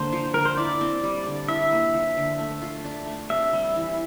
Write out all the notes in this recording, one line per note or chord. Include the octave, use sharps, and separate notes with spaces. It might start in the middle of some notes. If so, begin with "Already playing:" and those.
Already playing: D3 A#3 C5
F3
D3 A#4
C5
E4 D5
C4
G3
D3
E4 E5
A#3
F3
D3
A3
F4
D4
A3
C3 E5
G3
E3